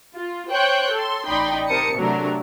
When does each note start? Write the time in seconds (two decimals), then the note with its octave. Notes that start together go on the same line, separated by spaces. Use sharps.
0.15 F4
0.52 C5 C#5 G5 C#6 F#6 G6
0.93 A4 C6
1.25 A1 D#4 D5 G5 B5 C6
1.67 C3 A#4 C5 A5 D#6 C#7
1.98 C3 F#3 A3 D4 A#4